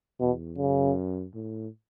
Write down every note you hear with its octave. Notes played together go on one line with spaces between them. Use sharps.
E2 B2
F#2 C#3
A2